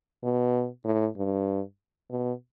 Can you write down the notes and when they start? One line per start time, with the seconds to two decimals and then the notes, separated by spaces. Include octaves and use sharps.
0.24 B2
0.85 A2
1.17 G2
2.10 B2